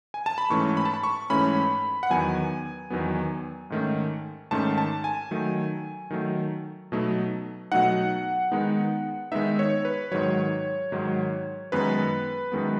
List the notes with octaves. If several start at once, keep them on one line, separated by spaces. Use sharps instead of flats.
G#5
A5
B5
G#2 E3 A3 C#4 C#6
B5
A5
B5
C#6
G#2 E3 A3 C#4 B5
F#5
E2 D#3 F#3 B3 G#5
E2 D#3 F#3 B3
G#2 D#3 A3 C#4
G#2 D#3 A3 C#4 A5
A5
G#5
D#3 F#3 A3
D#3 F#3 A3
B2 F#3 A3 D#4
B2 F#3 A3 D#4 F#5
D#3 G#3 B3 D#4
D#3 G#3 B3 D#4 E5
C#5
B4
G#2 D#3 F#3 C#5
G#2 D#3 F#3
F#2 D#3 G#3 B3 B4
F#2 D#3 G#3 B3